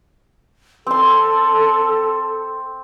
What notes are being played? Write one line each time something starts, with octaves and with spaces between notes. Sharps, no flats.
C4 A4 C6